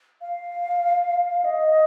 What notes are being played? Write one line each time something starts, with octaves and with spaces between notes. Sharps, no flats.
F5
D#5